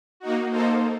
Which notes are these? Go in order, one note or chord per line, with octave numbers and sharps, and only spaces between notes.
A#3 D#4 F#4
A#3 D#4 A4 C5